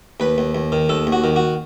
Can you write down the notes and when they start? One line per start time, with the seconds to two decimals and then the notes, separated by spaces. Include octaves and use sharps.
0.20 D#2 B4
0.38 D#2
0.55 D#2
0.72 D#3
0.89 D#2 A4
1.07 D#2
1.12 F#4
1.24 D#3
1.36 F#4